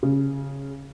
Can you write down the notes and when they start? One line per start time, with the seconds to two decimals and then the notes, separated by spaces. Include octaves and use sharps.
0.03 C#3